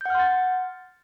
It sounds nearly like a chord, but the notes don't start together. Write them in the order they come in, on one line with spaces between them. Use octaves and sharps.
G6 F#5 F6 C6 A6